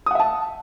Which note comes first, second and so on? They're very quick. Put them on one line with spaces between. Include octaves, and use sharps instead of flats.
D#6 F#5 E5 A5